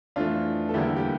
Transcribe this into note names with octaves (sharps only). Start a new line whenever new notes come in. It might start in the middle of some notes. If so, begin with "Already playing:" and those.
F2 E3 A3 D4 F4
A4
E2 D3 G3 A#3 E4 G4
G4